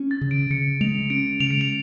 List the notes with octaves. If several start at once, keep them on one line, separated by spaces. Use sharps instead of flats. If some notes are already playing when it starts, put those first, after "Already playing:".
Already playing: C#4
A6
C#3
D7
C#3 C#7
G#3 F7
C#4 D7
C#3 F7
D7
F7